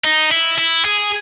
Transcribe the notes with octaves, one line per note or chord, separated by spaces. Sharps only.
D#4
E4
E4
G#4